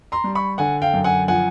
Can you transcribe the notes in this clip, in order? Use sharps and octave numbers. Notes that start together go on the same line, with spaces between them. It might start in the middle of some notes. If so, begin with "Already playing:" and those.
A#5 C6
G3
B5 C#6
D3 F#5 G#5
F5 G5
F#2
F#5 G#5
F3 F#5 G#5